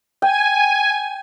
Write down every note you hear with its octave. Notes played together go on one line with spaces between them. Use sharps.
G5 G#5